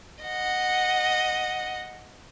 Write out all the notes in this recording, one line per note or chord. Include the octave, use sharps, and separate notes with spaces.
D#5 F#5